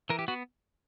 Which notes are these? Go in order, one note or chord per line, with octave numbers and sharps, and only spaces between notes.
E3 A#4
G4
B3 F#4